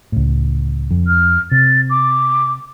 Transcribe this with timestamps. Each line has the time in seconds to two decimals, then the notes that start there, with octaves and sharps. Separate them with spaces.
0.12 C#2 A2
0.91 F2
1.07 F6
1.52 C3 A6
1.90 D6